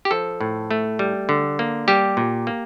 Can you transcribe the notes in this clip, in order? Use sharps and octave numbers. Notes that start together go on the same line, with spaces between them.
G4
F3 A4
A2
A3
G3
D3
A#3
G3 G4
A#2
A#3